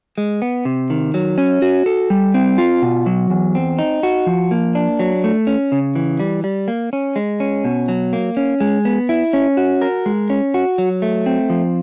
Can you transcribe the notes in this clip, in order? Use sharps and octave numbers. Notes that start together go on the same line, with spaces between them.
G#3
B3
C3
D#3
F#3
C#4
F#4
A4
G3
C4
F4
B2
F#3
E2
C4
D#4
F#4
F3
A#3
D4
F#3
A3
C#4
C#3
E3
G3
G3
A#3
C#4
G#3
C#4
B2
F#3
A#3
C#4
G#3
B3
E4
C#4
F#4
A#4
G#3
C#4
F#4
F#3
A3
C4
F3